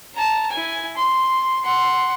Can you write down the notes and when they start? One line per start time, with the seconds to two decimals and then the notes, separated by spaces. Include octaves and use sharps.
0.15 A5 A#5
0.51 E4 G#5
0.97 C6
1.64 F#5 C6